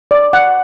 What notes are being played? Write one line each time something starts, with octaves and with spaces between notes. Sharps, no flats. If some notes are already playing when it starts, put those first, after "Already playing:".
D5
F#5